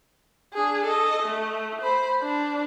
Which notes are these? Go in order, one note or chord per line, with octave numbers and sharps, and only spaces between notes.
D4 G#4
A4 D#5
A3
C5 B5
D4